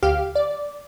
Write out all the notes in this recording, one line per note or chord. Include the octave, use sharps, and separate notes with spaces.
D2 G4 F5
D5